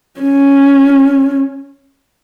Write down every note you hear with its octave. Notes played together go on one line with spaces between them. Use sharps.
C#4